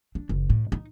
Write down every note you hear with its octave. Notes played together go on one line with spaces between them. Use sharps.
D4
F#1
A2
D#4